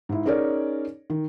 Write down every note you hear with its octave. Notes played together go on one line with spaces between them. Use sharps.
G#2 E4
C#4 D#4 G#4 A#4 C#5 D5
D#3